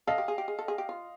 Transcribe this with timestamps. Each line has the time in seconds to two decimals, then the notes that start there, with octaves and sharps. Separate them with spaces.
0.07 A4 D#5 F5
0.18 G4
0.28 G#4
0.38 G4
0.48 G#4
0.59 A4
0.68 G#4
0.78 G4
0.89 F4